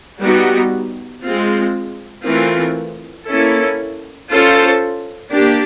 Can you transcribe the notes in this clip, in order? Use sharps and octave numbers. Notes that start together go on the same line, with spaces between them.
G3 B3 D#4 F#4
G#3 C4 F4
E3 A3 C4 F4 A#4
A#3 C#4 E4 A4
C#4 F4 A4 C5
A#3 D4 G4